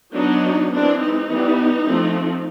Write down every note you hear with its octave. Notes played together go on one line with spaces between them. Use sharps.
F#3 B3 D4 D#4
E3 G#3 C4 D4
D#4
E3 G3 B3
F3 A3 C4